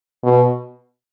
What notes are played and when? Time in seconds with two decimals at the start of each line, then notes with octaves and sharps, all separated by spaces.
0.23 B2